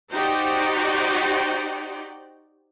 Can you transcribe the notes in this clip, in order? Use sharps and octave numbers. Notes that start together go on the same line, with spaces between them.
D#4 F#4 G4 C5 D5 G5